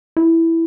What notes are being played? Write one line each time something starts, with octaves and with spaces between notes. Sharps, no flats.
E4